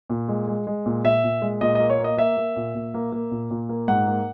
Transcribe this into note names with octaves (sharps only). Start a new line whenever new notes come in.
A#2
G#3
G#3
G#3
A#2
A#2 E5
A#2
G#3
A#2 D#5
A#3 D#5
C#5
A#3
D#5
A#3 E5
A#3
A#2
A#2
A#3
A#3
A#2
A#2
A#3
G#2 F#5
A#3